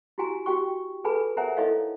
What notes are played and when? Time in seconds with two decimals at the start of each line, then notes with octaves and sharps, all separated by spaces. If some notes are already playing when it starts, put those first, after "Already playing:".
0.18 E4 F#4 G4 G#5 A#5
0.46 F#4 G4 G5 C#6
1.04 G#4 A4 B4 G#5 A5 B5
1.37 A#4 C5 E5 F#5 G#5 A#5
1.57 D#4 E4 A4 C#5 D#5 F5